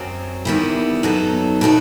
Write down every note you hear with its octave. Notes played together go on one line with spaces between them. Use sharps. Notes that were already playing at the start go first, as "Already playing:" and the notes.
Already playing: F#2 F#3 C4
E2 D#3 G3 B3 E4
F#2 F#3 B3 D#4 A4
B2 A3 D#4 F#4